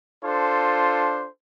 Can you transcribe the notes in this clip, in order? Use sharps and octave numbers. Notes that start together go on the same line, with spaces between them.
D4 F4 A4 C5